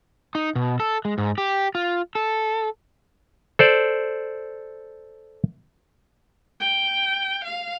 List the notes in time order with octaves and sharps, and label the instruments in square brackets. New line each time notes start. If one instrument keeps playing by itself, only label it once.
[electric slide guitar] D#4
B2
A4
G#3
G#2
G4
F4
A4
[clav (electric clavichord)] A4 C5 D5
[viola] G5
F5